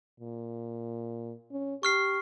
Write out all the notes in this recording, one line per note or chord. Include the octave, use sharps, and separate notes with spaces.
A#2
C#4
G4 C#6 F6 C7